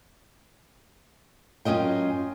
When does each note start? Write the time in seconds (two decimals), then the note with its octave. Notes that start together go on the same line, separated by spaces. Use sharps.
1.65 F#2 C#4 F4 D#5 G5